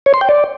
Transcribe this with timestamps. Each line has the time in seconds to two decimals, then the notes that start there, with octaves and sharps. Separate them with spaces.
0.06 C#5
0.14 C6
0.21 G5
0.29 D5